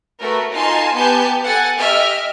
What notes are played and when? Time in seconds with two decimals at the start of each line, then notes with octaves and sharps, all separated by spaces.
0.20 A3 F#4 A#4 B4
0.52 D#4 F4 G#5 A5 C6
0.94 B3 G4 G#5 A5 G6
1.44 A4 F#5 G#5 A6
1.77 G4 D#5 E5 F6